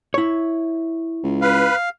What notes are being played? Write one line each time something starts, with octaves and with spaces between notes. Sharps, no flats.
E4 C#5
C#2
B4 F5